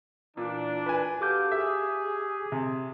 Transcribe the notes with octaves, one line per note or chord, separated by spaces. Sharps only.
A#2 E3 D4
B4 G#5
F#4 G4 A4 F5 D6 G6
G#4 E5
C3